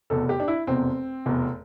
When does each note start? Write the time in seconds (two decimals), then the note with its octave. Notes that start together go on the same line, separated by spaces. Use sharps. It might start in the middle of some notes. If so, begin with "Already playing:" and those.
0.10 F1 E2 B2 A4
0.29 G4
0.40 D4
0.48 E4
0.67 F1 E2 B2 C4
1.26 F1 E2 B2